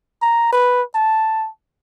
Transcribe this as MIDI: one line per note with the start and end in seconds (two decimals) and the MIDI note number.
0.22 0.49 82
0.53 0.82 71
0.95 1.49 81